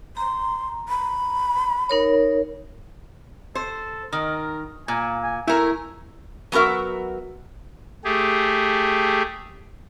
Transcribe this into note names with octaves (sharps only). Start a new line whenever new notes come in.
A#5 C6
B5
D#4 A#4 C#5
A4 C5
D#3 A#4
A#2 G#5
G#5
A3 E4 A#4 G#5
F#3 B3 F#4 A#4 E5
A3 G4 G#4